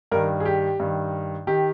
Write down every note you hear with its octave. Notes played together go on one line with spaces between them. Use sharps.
G2 D#3 A#4
G#4
G4
G2 D#3
D#3 G4